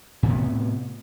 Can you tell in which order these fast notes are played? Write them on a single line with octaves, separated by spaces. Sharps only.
A2 B3 C3